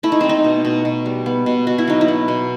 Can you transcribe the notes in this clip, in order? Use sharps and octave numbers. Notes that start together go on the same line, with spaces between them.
A3 E4
D#4
A3 C4
D#4
B2
B2
B2
G3
B3
B2
B2 F#4
E4
F#3 D#4
E4
B3
B2